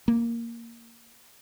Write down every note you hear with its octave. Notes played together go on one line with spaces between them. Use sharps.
A#3